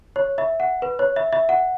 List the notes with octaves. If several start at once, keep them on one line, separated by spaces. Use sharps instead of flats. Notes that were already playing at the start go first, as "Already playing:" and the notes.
C#5
E5
F#5
B4
C#5
E5
E5
F#5